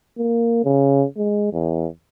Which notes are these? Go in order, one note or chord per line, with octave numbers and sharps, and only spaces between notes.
A#3
C#3
G#3
E2